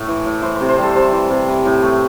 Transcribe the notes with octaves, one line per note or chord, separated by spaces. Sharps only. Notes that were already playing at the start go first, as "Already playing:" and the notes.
Already playing: A2 A3
E3
A2
E3 C5
C3 C5
C5
G3 A4
C3 C5
E3
C3
E3
A2
A3